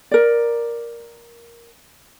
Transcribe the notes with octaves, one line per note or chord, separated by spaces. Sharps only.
A#4 D5